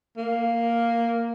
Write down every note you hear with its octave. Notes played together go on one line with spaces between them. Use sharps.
A#3